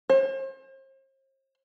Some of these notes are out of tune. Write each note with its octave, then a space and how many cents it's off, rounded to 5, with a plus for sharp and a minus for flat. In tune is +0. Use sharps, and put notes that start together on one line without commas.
C5 +40